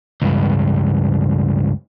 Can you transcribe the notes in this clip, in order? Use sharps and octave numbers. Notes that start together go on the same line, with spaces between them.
C#2 G2